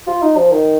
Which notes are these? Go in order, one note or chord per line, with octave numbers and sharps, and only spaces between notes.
F4
D#4
F3
D#3